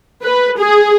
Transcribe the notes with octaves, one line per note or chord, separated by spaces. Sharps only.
B4
G#4